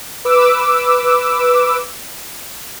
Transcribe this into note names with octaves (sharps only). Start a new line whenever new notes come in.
B4 D6 E6